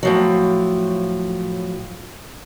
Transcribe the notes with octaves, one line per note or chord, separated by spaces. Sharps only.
A2 F3 F#3